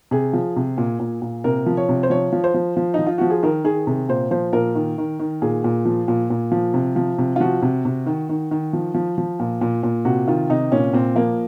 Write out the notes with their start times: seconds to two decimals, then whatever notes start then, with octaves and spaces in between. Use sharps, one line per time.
0.11 C3 G#4
0.33 F3
0.56 C3
0.78 A#2
1.00 A#2
1.22 A#2
1.44 C3 A#4
1.66 F3
1.77 C#5
1.89 C3
2.03 C5
2.10 F3 C#5
2.33 F3
2.44 C5
2.54 F3
2.77 F3
2.94 F3 D#4
3.07 F4
3.18 F3 F#4
3.30 G#4
3.43 D#3 A#4
3.64 D#3 G#4
3.87 C3 G#4
4.09 A#2 C5
4.31 F3 C5
4.53 A#2 A#4
4.75 D#3
4.98 D#3
5.19 D#3
5.42 A#2 G#4
5.64 A#2
5.85 F3
6.08 A#2
6.30 A#2
6.52 F3
6.74 C3
6.96 F3
7.18 C3
7.36 F4
7.40 F3 F#4
7.62 C3
7.85 C3
8.06 D#3
8.29 D#3
8.51 D#3
8.73 F3
8.94 F3
9.18 F3
9.39 A#2
9.61 A#2
9.83 A#2
10.05 C3 F#4
10.28 D#3 F4
10.49 C3 D#4
10.72 A#2 C#4
10.93 A#2 C4
11.15 F3 A#3